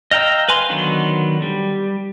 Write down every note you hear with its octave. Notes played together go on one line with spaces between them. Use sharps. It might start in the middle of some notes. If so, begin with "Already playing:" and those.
D#5 F5 G5 A#5 E6
B4 F5 G#5 C6
D3 D#3 F#3 B3 C6
G3